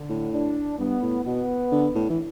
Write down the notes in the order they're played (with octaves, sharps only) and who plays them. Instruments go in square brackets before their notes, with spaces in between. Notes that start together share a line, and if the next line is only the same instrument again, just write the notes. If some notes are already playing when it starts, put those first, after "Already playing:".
Already playing: [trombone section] D3
[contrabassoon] A2
[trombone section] D4
[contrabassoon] G2 [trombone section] B3
[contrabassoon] A2
[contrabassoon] B2 [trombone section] B3
[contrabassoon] D3
A2
E3